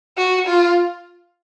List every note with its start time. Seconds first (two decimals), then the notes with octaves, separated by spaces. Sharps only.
0.18 F#4
0.47 F4